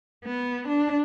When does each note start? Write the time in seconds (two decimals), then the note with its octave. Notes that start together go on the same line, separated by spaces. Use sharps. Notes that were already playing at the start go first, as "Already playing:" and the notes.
0.24 B3
0.68 D4